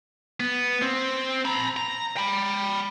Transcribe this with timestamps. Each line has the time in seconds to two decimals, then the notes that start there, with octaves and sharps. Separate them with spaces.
0.40 B3
0.82 C4
1.45 A#5 B5
1.76 A#5
2.17 G5 B5